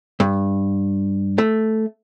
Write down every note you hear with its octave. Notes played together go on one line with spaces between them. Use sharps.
G2
A3